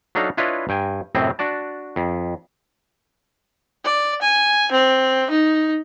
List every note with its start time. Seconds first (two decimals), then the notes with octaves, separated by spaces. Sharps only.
0.15 F#3 D4 D#4 A4 F5
0.37 D4 E4 F4 B4 C#5 D#5
0.69 G2 G5 G#5
1.15 F#2 A2 C3 C4 E4 D#5
1.39 D4 F#4 D5 A5
1.96 F2
3.85 D5
4.21 G#5
4.72 C4
5.30 D#4